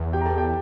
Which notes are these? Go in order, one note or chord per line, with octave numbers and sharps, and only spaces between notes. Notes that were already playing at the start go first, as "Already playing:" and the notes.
Already playing: E2
G4 G5
A#5
A4 A5
G4 G5